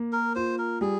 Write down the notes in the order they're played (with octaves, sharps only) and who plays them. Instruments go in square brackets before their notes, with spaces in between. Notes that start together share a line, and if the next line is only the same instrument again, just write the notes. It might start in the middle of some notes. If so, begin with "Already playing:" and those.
Already playing: [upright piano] A#3
[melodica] A#4
[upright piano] F4 [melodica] C5
[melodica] A#4
[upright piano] G3 [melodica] G#4